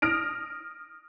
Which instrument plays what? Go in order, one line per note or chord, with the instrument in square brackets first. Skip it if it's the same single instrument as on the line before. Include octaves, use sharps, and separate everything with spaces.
[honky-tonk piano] D#6 F6 A#6 D7